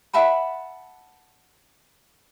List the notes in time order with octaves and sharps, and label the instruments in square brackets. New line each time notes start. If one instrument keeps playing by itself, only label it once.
[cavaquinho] E5 F#5 A5 B5